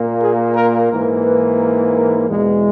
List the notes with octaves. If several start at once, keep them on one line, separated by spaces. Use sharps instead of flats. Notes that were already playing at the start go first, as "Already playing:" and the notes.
Already playing: A#2 A#3
G#4
A#4
G#2 E3 A#3 A#4
B4
A#4
A#4
E2 B2 G#3